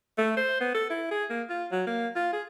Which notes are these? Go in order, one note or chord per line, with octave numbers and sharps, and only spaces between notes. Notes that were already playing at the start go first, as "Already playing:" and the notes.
A3
C5
B3
A4
E4
G#4
A#3
F4
F#3
A#3
F4
G#4